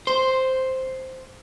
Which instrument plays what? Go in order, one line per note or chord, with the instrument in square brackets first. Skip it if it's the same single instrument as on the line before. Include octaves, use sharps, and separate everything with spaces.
[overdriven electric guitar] C5 [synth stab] C6